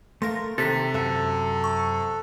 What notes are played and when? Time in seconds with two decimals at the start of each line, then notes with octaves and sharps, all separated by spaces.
0.22 A3 A#3 A#4 C6 A#6
0.58 C3 D#3 A4 A6 B6
0.94 F#2 A4 E5
1.64 C#6